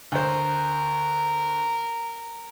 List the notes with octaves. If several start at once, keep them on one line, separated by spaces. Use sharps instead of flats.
D2 A#4 C5